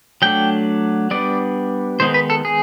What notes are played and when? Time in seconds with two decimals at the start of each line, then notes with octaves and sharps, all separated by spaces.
0.22 F#3 A3 D4 G5
1.11 G3 B3 D4 D5
2.00 D#3 G#3 B3 D#4 C5
2.14 B4
2.30 A4
2.45 G#4